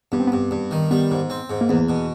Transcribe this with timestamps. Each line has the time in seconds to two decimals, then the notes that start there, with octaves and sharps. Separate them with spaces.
0.12 G2 B3
0.20 C4
0.27 G2 B3
0.51 G2
0.71 D#3
0.91 G3 B3
1.11 G#2
1.30 C4
1.50 G#2
1.61 A#3
1.69 E2 B3
1.89 B2